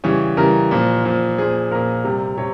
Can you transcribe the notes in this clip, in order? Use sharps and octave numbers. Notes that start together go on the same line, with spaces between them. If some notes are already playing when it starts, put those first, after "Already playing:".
C#3 E3 G3 C#5
C#3 E3 G3 A#4
A#2 F3
A#2 F3
A#2 F3 G#4
A#2 F3 A#4
C3 G3
C3 C#5